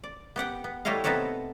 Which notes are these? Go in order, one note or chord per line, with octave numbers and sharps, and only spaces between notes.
D5
B3 G4 F#5 G5
B3
G3 A3 E4 C#5 D#5 F5
C3 B3 D#4 A4 B4 C#5